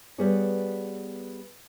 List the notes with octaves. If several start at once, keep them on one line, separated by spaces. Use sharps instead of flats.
G3 B3 G#4 C#5